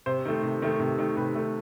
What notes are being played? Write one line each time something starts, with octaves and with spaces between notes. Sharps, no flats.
C3 C5
D#3 A3
C3
D#3 A3
C3
D#3 A3
C3 B4
D#3 A3